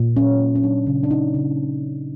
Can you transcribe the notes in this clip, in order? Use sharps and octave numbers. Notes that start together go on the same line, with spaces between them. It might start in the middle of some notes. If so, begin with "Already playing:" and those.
Already playing: A#2
F#3 C#4
A#3
C#4
F#3 D4
C#3
D4
C#3 D#4
C#3